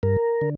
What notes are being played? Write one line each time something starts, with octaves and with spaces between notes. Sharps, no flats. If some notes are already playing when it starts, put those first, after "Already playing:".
G2 A#4
D3